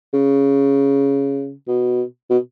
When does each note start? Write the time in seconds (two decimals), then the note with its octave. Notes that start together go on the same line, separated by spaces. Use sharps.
0.14 C#3
1.68 B2
2.30 B2